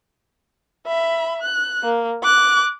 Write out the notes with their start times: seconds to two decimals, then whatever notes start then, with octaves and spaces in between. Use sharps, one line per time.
0.87 E5 B5
1.41 F#6
1.83 A#3
2.23 D6 F#6